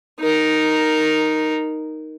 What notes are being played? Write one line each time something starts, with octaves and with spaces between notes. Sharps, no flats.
D#4 A#4